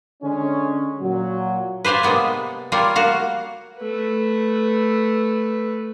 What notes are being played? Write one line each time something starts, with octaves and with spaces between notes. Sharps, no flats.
D3 G#3 C#4
A#2 F#3
B4 C5 D5 F5 G#5
C3 G#3 A#3 B3 D5
G3 F4 A#4 C#5 D5
A#3 F#4 F5
A3 B4